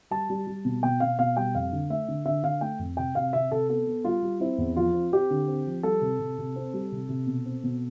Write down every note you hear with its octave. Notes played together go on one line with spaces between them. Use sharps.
G3 A5
G3
G3
B2
B2 G5
B2 F5
B2 F5
G3 G5
F2 F5
D3
A3 E5
D3
D3 E5
D3 F5
A3 G5
F2
C3 G5
C3 F5
C3 E5
C3 A4
B3 A4
B3
G3 F4
G3
C4 E4
E2
F3 F4
C4
C4 G4
D3
C4
F3
G3 A4
C3
C3
C3
C4
G3
C3
C3
B2
C4
B2